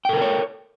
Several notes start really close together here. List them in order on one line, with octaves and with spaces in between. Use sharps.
G5 A4 A#4 C5 C#5